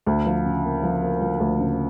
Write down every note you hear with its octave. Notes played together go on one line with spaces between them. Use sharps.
D2
F3
C#3
A#3
F3
A#3
F3
D2
C#3